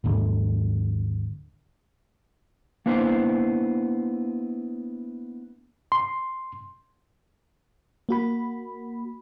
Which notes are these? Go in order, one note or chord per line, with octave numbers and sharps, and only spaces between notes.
G#1 D#2 G#2 D3
A#3 B3 D4 E4 C5
C6
A#3 F#4 B5